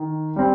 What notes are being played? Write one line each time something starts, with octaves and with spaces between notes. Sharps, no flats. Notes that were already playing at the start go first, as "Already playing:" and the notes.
Already playing: D#3
G3 C4